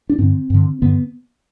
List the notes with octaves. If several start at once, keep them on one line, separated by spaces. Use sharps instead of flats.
D4
G2 D3 C4
G2 D3
G2 D3 B3